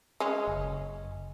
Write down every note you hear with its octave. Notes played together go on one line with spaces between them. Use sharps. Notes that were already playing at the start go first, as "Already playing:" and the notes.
G#3 C#4
F#1